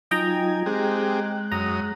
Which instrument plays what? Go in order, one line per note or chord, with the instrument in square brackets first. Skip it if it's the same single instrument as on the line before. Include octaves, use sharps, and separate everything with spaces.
[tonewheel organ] F#3 D#4 F4 [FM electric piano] D#5 G5 A#5 [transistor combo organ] G#5
[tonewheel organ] G#3 F#6 [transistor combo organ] C4 G4 G#4
[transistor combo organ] F#2 D#6 [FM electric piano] A#5